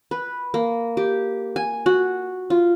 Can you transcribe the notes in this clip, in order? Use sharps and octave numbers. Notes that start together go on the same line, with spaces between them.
B4
A#3
G4
G#5
F#4
F4